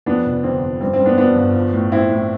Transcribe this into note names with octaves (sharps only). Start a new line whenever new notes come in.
F2 B3 D4
F1
D3 C4
F2
G2 C4
C4
G2
B3 D4
F3 B3 D4
G1
F3
A2
A2 C4 E4
A2